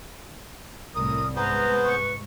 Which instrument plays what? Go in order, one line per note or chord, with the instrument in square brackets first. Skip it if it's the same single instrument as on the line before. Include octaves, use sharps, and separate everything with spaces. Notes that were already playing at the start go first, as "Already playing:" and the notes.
[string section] C2 A2 [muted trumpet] A#4 [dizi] D#6
[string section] G#2 [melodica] B3 G#4 C5 [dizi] B4 [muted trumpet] A#5
[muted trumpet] C#6